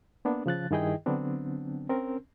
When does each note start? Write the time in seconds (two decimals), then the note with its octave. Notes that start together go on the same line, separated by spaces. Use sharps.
0.25 A#3 B3 D4
0.46 C#3 F3 F#6 A6
0.71 G2 D#3 E4 G#4 D#5 G5
1.06 D3 F#3 B3 C4 D4
1.89 C4 C#4 A#4